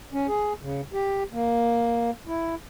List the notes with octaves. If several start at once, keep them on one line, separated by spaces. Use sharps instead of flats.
C#4
G#4
C#3
G4
A#3
E4